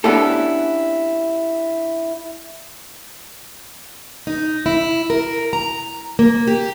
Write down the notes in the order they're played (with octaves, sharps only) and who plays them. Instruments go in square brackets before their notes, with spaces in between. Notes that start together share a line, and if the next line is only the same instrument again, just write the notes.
[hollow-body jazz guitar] B3 C#4 D4 E4 G4 A4
[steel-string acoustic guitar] D#4
E4
A#4
A#5
A#3
G4